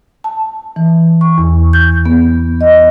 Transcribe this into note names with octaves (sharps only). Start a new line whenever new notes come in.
A5
E3
C#6
E2
G6
B3
D#5